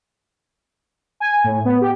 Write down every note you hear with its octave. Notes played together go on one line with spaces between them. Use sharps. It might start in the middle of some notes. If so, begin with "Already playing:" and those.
G#5
A2
B3
G4